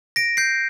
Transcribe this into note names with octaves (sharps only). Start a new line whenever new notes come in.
A#6 D7
G6 C7